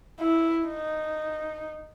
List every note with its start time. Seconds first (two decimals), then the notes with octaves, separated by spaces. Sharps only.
0.21 E4
0.67 D#4